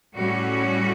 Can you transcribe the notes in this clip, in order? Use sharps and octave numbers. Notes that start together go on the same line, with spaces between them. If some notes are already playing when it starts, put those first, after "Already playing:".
A2 G3 C#4 F#4